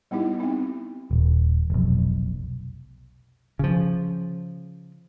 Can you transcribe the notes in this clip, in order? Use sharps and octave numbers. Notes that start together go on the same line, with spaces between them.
G3 B3 D#4 E4 G4
C4 D#4
D#1
F1 B1
C#3 F3